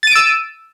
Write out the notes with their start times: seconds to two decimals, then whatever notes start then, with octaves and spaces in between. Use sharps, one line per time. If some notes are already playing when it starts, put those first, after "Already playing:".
0.03 A6
0.07 D#7
0.11 D7
0.15 E6